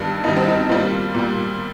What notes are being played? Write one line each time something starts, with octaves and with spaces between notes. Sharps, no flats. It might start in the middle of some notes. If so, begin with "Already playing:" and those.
Already playing: G2 D#3 G3
G2 D#3 G3 D#4
C4
D#4
A#2 G3 C4 F4
A#2 G3